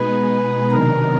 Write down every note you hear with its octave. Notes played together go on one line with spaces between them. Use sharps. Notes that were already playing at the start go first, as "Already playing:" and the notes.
Already playing: B2 G#3 B3 D#4 G#4 B4
C3 D#3 F#3 B3 D4 A#4